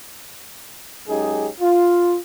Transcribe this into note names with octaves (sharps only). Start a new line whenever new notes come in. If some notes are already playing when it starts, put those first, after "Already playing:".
F#2 G#3 C#4 D#4 G4 G#4
F4